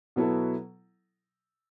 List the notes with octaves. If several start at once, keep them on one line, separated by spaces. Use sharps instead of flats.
B2 F#3 B3 E4 A4